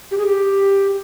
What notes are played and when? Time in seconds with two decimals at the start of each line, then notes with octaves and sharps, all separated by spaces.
0.11 G4
0.18 G#4
0.26 G4